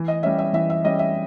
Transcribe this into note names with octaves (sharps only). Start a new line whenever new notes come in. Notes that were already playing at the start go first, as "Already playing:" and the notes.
Already playing: E3
D#5
G3 C#4 E5
E5
E3 E5
E5
G3 C#4 D#5
E5